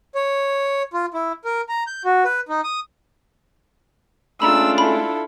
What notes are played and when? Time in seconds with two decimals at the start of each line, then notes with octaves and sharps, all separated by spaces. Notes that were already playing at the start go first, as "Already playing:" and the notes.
0.15 C#5
0.93 F4
1.14 E4
1.45 A#4
1.69 A#5
1.87 G6
2.05 F#4
2.25 B4
2.49 D#4
2.64 D#6
4.42 G#3 A3 C#4 D4 F4 A#5 B5 E6
4.78 E4 A4 B5